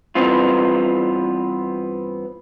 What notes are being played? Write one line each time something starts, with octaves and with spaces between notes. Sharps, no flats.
G2 E3 B3 C4 F4